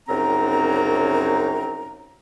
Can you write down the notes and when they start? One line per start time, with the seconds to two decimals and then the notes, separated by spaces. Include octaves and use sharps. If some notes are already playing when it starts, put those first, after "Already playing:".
0.09 C2 F#2 C#3 C4 D#4 A#5